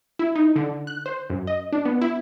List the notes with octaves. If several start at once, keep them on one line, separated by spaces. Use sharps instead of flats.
E4
D#4
D3
F#6
C5
F#2
D#5
D4
B3
E4